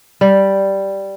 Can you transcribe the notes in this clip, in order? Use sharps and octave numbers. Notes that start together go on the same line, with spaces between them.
G3